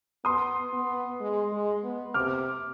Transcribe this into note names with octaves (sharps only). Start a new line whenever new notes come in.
B3 C6 D#6
B3
G#3
G#3
B3
C3 D6 F6